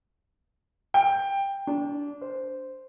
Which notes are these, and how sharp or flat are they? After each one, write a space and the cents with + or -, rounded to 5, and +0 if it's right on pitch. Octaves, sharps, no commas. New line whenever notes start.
G5 +10
D4 -25
C5 -10